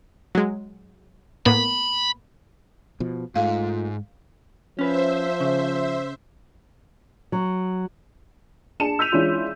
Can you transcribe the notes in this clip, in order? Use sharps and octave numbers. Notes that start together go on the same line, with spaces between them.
F#3 G#3
A2 A#3 B3 B5
B2 F3
G#2 A3 F4 F5
F3 C#4 B4 C5 E5
C#3
F#3
D4 G#4 A5 C#7 E7
E6 G6 B6 D#7 F7
E3 G#3 C#4 D4 F4